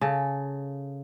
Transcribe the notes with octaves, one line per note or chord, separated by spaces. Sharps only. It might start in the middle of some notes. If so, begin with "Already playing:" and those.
C#3 A4